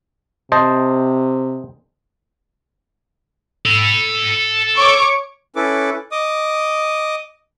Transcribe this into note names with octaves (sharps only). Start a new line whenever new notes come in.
C3 C5 D#5 A5
A4 B5
C#5 C#6 D6
C#4 E4 A4 B4 D6
D#5 D6 D#6